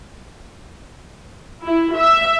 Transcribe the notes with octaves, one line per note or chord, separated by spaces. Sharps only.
E4
E5